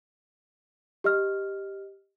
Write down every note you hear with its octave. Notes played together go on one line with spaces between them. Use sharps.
G4 D#5 F6